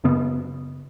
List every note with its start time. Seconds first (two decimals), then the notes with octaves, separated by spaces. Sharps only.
0.04 F#2 C#3 B3